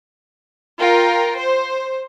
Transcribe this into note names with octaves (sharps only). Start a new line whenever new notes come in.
F4 A#4 G5
C5